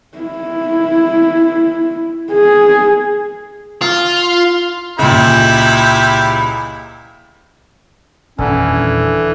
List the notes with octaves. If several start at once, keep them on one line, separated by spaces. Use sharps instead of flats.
E4
G#4
F4
C#2 A#2 E4 G4 B5
D#1 E2 D3 E3 C#4